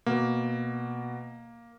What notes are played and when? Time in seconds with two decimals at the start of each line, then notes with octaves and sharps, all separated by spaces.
0.06 B2 A#3